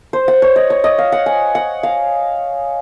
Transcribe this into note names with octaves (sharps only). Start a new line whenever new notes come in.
C5
F#5
C#5
D#5
C#5
D#5
F5
F#5
G#5
F#5
F5